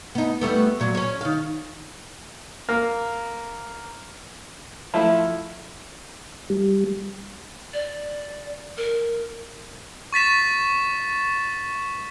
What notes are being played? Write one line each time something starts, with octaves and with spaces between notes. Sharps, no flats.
B3 D#4
G3 A3 B3
A#2 F#3
C#4 C#5
D#3 F5
A#3
F3 A3 E4
G3
D5
A#4
C#6 A6 B6 E7